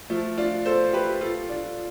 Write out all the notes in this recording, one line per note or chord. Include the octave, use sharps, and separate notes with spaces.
F3 A3
D4 F4
A4 C5
G4 B4
F4 A4
D4 F4